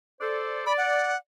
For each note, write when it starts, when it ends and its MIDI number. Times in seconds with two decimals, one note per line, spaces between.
0.21 0.64 69
0.21 0.64 72
0.21 0.64 74
0.66 1.13 74
0.66 0.73 83
0.78 1.17 78